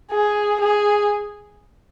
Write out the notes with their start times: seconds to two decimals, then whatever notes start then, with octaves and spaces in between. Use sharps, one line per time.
0.12 G#4
0.61 G#4